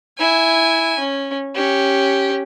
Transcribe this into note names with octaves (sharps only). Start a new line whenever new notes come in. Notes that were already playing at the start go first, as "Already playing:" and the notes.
E4 G#5
C#4
C#4 G4